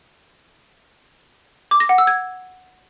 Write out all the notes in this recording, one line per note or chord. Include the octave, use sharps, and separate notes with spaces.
D6
A#6
F#5
E6
G#6